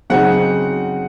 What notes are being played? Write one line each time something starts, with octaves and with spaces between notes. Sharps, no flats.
C#3 F#3 C4 D#4 F#5